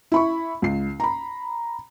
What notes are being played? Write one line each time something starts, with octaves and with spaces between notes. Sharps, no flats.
E4 B5 C#6
C#2 C7
A#5 B5